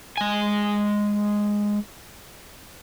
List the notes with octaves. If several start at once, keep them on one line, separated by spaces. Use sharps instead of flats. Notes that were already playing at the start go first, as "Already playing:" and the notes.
G#3 G#5